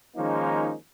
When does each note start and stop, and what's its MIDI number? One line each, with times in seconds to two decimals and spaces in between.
0.17 0.74 51
0.17 0.74 53
0.17 0.74 56
0.17 0.74 58
0.17 0.74 61
0.17 0.74 63